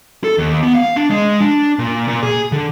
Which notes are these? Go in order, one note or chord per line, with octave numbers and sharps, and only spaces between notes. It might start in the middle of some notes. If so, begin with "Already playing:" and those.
A4
D#2
B3
F5
D4
G#3
D4
A#2
A#2
G#4
D3